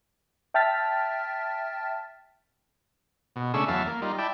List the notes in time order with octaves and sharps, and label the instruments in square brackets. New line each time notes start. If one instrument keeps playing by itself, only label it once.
[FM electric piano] E5 G5 A5 F6 A6 B6
[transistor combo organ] B2
C#3 A3 D4 G#4 C#6 E6
E2 F#3 E5 F5 A5
A#3
G3 D#4 F4
E4 D5 G5 A5